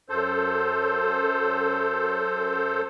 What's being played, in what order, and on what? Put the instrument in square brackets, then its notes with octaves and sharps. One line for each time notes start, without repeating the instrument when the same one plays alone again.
[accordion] F#2 A4 C5